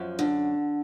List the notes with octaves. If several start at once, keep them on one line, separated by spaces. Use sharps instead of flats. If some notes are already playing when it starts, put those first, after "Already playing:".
Already playing: F#2 F3
D3